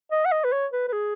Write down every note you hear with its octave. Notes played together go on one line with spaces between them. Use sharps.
D#5
F#5
D#5
B4
C#5
B4
B4
G#4